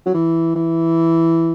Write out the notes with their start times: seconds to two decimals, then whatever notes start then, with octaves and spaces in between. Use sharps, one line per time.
0.06 F#3
0.14 E3
0.55 E3